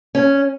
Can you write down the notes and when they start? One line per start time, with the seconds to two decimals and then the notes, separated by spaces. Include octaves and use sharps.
0.15 C#4